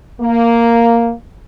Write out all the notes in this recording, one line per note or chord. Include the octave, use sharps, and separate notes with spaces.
A#3